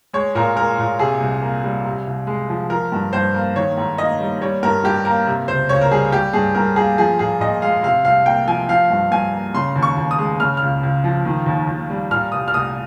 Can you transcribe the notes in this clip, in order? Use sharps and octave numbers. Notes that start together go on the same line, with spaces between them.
G#3 C#5
A#2 A#4
G#3 A#4
A#2
C3 G#4
C2
A#3
G3
C3
C2
G#3
F3
F3 A#4
G2
G2 C5
A#3
D#3 C#5
G#2
A#3 D#5
G3
G3 C#5
G2 A#4
G2 G4
A#3 A#4
C3
C#2 C5
C#2 C#5
A#4
G3 G#4
G3 G4
G2 G#4
G2 A#4
A#3 G#4
F3 G#4
A#2 G#4
A#2 D#5
G#3 F5
C3 F5
C2 F5
A#3 G5
F3 G#5
F3 F5
G2
G2 G#5
A#3
C#3 C6
D#2
C#6
D#2
D#6
G#3
C#3 F6
C#2 F6
C#2
F3
D#3
D#2
D#2
G3
A#2 F6
C2 D#6
F6
C2 D#6